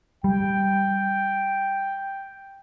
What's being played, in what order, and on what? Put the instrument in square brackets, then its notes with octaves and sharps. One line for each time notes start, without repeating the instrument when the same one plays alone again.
[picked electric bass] G3 [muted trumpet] G5